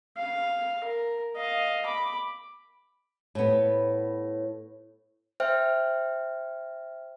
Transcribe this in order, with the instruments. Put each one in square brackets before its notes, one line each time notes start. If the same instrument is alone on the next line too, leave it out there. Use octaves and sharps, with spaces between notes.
[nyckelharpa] F5
A#4
D#5 F5
B5 D6
[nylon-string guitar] A2 B3
[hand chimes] C5 E5 G5 F6